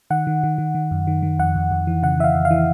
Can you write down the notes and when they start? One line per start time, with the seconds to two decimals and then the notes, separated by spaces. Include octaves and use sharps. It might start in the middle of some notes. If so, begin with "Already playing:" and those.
0.10 D#3 F#5
0.27 D#3
0.43 D#3
0.58 D#3
0.75 D#3
0.91 F#2
1.07 D#3
1.23 D#3
1.39 F2 F#5
1.56 F2
1.71 F2
1.87 E3
2.03 C#3 F#5
2.19 E3 E5
2.24 F5
2.35 F2
2.45 F5
2.51 E3